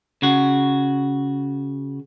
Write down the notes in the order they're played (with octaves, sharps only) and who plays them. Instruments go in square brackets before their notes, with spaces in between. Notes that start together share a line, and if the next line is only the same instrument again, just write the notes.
[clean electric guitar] C#3 F#4